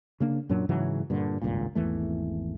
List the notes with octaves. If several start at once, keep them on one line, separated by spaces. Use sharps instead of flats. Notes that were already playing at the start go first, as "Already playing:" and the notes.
C#3 A#3 D4
F#2 A#2 F#3 D4
G#2 C#3 E3 F#3
G2 A#2 D3
G#1 C#2 G2 A#2
G#1 E2 E3 A3